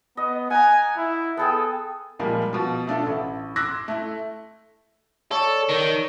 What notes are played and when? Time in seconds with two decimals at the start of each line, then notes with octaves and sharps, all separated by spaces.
0.17 B3 D#5
0.50 F#5 G#5 A#5
0.97 E4
1.37 B3 G#4 A4 G5
2.19 A#2 F3 G3 G#3 A#3
2.53 B2 F3
2.87 A3 D4 F4 A4
3.06 A1
3.56 C6 D6 E6 F#6 G#6 A#6
3.88 A3 E4
5.31 A4 C#5 D5
5.69 D#3